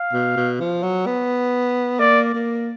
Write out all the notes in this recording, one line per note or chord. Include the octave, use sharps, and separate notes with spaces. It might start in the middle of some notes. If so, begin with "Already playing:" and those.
Already playing: F5
B2
B2
F3
F#3
B3
A#3 D5
A#3